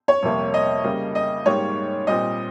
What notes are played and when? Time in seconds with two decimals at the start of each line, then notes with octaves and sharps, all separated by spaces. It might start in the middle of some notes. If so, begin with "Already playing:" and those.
0.08 C#5
0.23 F2 C3 G3 A#3
0.54 D#5
0.84 C#3 G3 A#3
1.15 D#5
1.46 G#2 G3 A#3 C#5
2.07 A#2 G3 C4 D#5